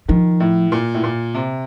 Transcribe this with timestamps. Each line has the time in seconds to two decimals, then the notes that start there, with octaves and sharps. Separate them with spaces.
0.08 D#3 F3
0.40 A2
0.72 A#2
0.94 A2
1.03 A#2
1.34 C3